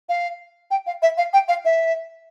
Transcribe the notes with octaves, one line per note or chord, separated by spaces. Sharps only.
F5
G5
F5
E5
F5
G5
F5
E5